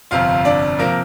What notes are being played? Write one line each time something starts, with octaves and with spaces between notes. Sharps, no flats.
G1 F2 C3 F4 F5
D4 D5
C3 F3 A#3 A#4